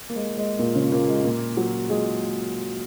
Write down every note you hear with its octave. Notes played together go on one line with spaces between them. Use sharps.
A#3
G#3
G#3
A#2 A#3
C#3 C#4
A#2 A#3
G#3
A#2 A#3
F#3
G#3 G#4